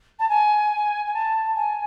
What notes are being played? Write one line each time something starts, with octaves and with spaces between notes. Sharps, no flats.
A5
G#5
G#5
A5
G#5